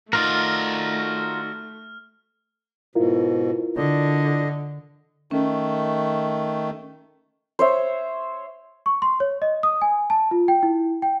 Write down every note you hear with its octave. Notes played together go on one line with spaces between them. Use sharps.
A3 D#4 F4 F#4 A#4 D5 F6
G#2 B2 E4 F4 A#4
D3 D4 D#5
D#3 A3 C#4
C5 C#5 E5
C#6
C6
C#5
D#5
D#6
G#5
A5
F4
G5
E4
G5